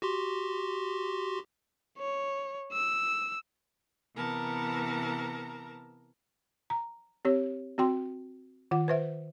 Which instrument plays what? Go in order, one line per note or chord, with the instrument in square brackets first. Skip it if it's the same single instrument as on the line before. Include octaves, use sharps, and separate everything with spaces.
[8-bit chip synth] F#4 G4 C6
[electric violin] C#5
E6
[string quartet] C3 E3 B3 A#4 A5 A#5
[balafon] A#5
C4 G4 C#5
C4 F#4 G5 C6
D#3 F4 F#5
B4 C5 E5